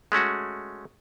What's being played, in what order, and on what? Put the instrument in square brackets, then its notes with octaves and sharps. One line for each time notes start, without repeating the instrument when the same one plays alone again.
[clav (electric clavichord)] G#3 A3 C#4 F#4